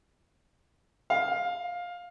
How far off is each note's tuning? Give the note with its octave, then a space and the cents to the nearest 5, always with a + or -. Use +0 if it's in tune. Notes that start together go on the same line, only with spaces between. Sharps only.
F5 +15